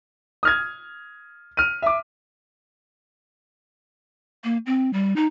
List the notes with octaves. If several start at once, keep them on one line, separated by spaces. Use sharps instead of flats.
D#6 F6 G#6
F6 D#7
E5 D6
A#3
C4
G3
D#4